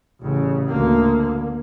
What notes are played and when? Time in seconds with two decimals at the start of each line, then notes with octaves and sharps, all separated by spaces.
0.21 A1 C#3
0.69 D2 A#3